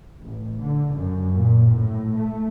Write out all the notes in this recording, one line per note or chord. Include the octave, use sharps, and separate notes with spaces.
A1
D3
F#2
A#2
A2
A3